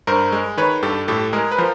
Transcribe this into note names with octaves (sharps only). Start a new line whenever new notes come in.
G2 A#4 C5
G#3
D#3 B4 C#5
G2 G4 A4
A2 G4 A4
G#3 G#4 A#4
B4
F3 A#4 C5